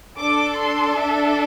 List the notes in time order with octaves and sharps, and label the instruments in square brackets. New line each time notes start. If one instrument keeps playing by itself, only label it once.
[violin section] D4 A4 D6
C6
E5